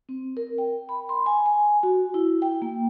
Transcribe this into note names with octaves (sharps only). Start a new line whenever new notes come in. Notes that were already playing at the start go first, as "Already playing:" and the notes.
C4
A#4
G5
B5
C6
G#5
G#5
F#4
E4
G5
A#3